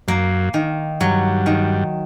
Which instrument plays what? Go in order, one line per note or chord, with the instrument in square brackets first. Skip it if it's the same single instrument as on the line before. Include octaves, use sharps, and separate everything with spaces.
[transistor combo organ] F#2 [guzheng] A#3
[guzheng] D#3
[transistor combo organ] G2 [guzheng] F#3
[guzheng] D#3